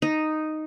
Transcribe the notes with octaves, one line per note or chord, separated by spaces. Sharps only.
D#4